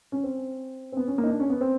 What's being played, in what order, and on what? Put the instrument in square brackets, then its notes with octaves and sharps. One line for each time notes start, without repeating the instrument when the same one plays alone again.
[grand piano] C#4
C4
C4
B3
C#4
A#3
D#4
D4
C#4
B3
C4